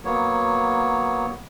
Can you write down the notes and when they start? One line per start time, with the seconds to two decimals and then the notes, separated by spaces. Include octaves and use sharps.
0.05 F#3 A#3 B3 C#5